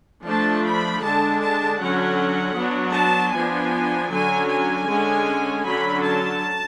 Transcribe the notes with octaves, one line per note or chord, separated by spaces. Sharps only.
F3 A3 D4 A5
B5
D3 G#3 D4 A5
A5
D3 F#3 C#4 F#5
F#3 B3 D4
A5
F3 B3 D4 G#5
D3 F#3 C#4 G#5
G#5
D3 G#3 C#4
D3 F#3 C#4 B5
A5